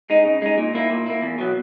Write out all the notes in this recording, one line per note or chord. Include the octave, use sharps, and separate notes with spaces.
G#3 D#4
C#3
G#3 D#4
A#2
A#3 E4
A#2
A#3 E4
E2
B2 F#3 B3